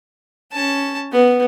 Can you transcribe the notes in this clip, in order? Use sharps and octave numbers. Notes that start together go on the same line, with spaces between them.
C#4 A5
B3